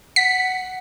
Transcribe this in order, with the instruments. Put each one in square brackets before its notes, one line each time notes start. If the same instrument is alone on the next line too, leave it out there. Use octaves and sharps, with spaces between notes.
[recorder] F#5 [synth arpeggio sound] B6